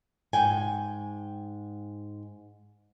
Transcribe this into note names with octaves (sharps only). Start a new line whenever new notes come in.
G#2 G5 G#5